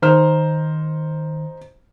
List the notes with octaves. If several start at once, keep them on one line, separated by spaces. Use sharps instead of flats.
D#3 D#4 C5 F6